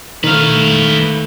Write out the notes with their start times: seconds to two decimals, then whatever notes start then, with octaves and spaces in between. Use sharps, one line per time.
0.24 D#3 A3 B4 F5